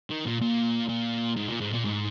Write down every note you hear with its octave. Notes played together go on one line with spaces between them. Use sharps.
D#3
A#2
A#2
A#2
G#2
A#2
G#2
A#2
G#2